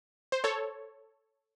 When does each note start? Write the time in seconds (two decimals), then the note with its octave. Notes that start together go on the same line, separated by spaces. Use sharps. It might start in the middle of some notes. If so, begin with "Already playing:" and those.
0.32 C5
0.44 A4 C#5